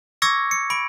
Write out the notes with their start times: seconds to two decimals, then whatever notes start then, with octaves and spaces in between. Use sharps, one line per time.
0.22 C#6 D6 E6 G#6 A#6 C#7
0.51 C#7
0.70 B5 D7